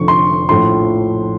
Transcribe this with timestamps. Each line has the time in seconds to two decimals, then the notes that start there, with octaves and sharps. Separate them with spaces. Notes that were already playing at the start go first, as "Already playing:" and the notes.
Already playing: F1 F2 D3 C#6
0.08 C6
0.49 A#1 A2 F3 C6